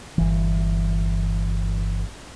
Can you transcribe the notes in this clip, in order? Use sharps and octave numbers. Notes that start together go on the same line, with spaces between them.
G1 E3